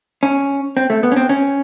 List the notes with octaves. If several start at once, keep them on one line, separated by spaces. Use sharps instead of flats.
C#4
C4
A3
B3
C#4
C4
C#4